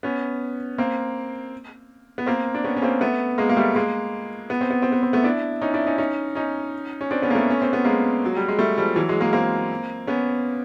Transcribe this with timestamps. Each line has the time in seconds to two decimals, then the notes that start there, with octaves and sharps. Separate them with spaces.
0.03 B3 C#4
0.78 A#3 C4
2.18 B3
2.26 A#3 C4
2.54 D4
2.64 B3 C#4
2.77 C#4
2.82 A#3 C4
3.01 A3 B3
3.38 G#3 A#3
3.49 A#3
3.57 G3 A3
3.75 G#3 A#3
4.50 B3
4.61 C4
4.71 B3
4.82 C4
4.92 B3
5.03 C4
5.13 A3 B3
5.24 D4 E4
5.62 C#4 D#4
5.74 D4 E4
5.87 C#4 D#4
5.98 C#4 D#4
6.35 C#4 D#4
7.01 C#4
7.11 C4 D4
7.22 B3 C#4
7.30 A#3
7.35 A3 B3
7.50 C#4
7.62 C4
7.73 B3
7.85 G#3 A#3
8.26 F#3
8.37 G3
8.48 G#3
8.59 G3 A3
8.78 F3 G3
8.96 E3 F#3
9.09 F#3 G#3
9.20 G#3 A#3
9.33 A#3 C4
10.07 B3 C#4